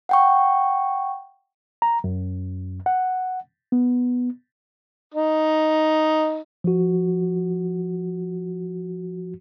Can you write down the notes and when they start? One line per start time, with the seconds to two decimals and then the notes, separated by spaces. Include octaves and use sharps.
0.09 F#5 G5 C#6
1.82 A#5
2.04 F#2
2.86 F#5
3.72 B3
5.14 D#4
6.64 F3 F#4